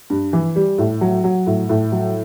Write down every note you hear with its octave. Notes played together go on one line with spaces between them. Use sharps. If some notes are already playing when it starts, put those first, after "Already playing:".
G2
E3
G3
A2
F#3
F#3
A2
A2
F#3